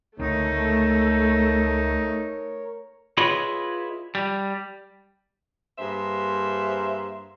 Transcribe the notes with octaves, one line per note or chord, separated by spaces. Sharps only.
C#2 D3 A3 C4 D#4 A#4 C#5
E4 F4 G#4 B4 C#5 D#5
G3
G2 A#3 G#4 C5 E5